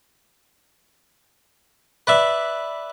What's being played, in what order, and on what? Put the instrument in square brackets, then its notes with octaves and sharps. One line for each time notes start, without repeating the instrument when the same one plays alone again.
[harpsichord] B4 D5 E5